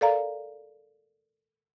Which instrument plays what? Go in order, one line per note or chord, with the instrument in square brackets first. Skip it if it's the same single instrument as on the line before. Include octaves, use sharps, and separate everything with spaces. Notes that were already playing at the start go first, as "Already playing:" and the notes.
[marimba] A4 A#4 D5 F5 A#5